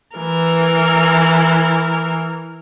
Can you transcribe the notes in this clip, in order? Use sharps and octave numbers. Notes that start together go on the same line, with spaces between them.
E3 A#4